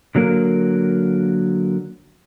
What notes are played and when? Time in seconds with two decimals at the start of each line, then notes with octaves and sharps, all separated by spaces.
0.15 D3 F#3 A#3 A#4